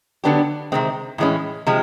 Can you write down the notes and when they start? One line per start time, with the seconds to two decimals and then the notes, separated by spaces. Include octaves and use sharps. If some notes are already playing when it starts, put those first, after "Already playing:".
0.24 D3 F#3 B3 D4 G4
0.72 C3 D#3 G#3 C4
1.18 A2 E3 G#3 C#4
1.67 C3 F3 G#3